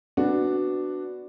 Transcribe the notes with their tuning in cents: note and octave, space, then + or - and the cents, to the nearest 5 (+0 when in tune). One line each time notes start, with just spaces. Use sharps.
B3 +10 D4 +5 F#4 +0